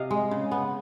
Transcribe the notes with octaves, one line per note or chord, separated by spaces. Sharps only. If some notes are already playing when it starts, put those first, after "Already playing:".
Already playing: C3 D#5 F5
G#3
C#3
B3